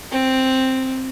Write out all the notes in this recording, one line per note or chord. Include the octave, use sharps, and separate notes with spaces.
C4